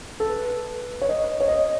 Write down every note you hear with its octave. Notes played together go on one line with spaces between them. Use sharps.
A4
B4
C#5
D#5
C#5
D#5